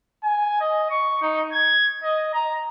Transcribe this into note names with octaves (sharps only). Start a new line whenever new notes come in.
G#5
D#5
C#6
D#4
G#6
D#5
A#5